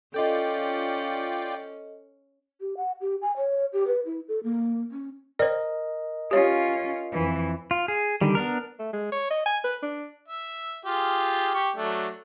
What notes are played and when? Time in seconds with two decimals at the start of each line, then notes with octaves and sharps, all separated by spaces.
0.14 C#4 F4 A4 D5 D#5 G5
2.61 G4
2.77 F#5
3.01 G4
3.22 G#5
3.37 C#5
3.73 G4
3.87 B4
4.05 E4
4.28 A4
4.44 A#3
4.91 C#4
5.39 A#4 C5 D5 D#5
6.31 C#4 F4 G4 C#5
7.12 F2 E3
7.71 F4
7.88 G#4
8.21 D3 D#3 G3
8.35 B3 D4 A#4
8.79 A3
8.93 G#3
9.12 C#5
9.31 D#5
9.46 G#5
9.64 B4
9.83 D4
10.28 E5
10.85 F4 G4 G#4
11.55 G4 C#6
11.76 F#3 A3 D4